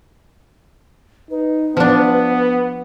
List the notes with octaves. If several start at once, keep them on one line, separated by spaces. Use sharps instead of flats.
D#4 B4
F3 B3 D4